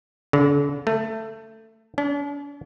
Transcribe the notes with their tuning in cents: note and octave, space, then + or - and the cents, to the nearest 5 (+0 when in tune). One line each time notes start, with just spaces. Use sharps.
D3 -40
A3 +15
D4 -45